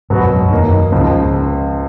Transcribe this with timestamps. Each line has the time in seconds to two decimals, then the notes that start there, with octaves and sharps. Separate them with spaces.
0.10 G#2 B2 F#3 B3 F#4
0.19 F2
0.30 F#2
0.41 F2
0.50 F#2 D#3 A#3 D#4
0.71 F#2
0.92 C#2 G#2 C#3 F3